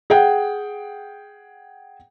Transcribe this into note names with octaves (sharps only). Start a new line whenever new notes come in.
G#4 F#5 G5